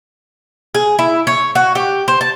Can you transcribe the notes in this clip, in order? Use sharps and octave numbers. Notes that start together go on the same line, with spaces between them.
G#4
E4
C#5
F#4
G4
C5
A5